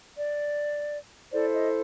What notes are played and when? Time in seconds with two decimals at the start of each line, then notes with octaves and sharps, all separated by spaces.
0.17 D5
1.32 E4 A4 C5 D5
1.53 D#5